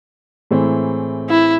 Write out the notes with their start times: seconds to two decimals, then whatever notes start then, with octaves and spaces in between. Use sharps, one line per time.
0.51 A2 E3 G#3 C4
1.29 E4